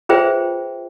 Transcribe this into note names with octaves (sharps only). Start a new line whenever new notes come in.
F4 G#4 B4 C5 E5 G5